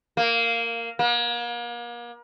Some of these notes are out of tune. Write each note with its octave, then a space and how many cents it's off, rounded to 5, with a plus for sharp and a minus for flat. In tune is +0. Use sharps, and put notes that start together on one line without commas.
A#3 -10
A#3 +40